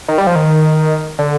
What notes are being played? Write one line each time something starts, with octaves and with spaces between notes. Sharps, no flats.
D#3
G3
F3
D#3
D3